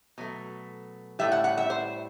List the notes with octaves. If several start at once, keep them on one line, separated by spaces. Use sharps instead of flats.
B2 F#3 A3
A2 G3 E5
F#5
F#5
E5
C5